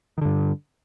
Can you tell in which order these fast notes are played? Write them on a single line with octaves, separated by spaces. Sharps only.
D#3 D3 G2